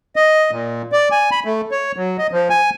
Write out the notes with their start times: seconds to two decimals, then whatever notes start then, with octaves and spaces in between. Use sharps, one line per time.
0.16 D#5
0.51 A#2
0.92 D5
1.12 G#5
1.31 B5
1.45 A3
1.71 C#5
1.96 F#3
2.18 D#5
2.32 F3
2.50 G#5